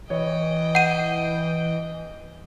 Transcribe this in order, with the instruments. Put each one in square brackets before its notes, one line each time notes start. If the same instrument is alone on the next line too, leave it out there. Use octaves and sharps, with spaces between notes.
[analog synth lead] E3 [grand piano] C#5 [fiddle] D#5 G5
[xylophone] F#5 D#7 [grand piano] G6